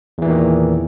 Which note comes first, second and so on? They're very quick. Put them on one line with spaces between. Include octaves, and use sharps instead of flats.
E2 E3 A#2 D#3